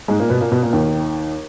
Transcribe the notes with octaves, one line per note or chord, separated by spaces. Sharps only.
G#2 G#3
A#2 A#3
B2 B3
A#2 A#3
B2 B3
A#2 A#3
D#2 D#3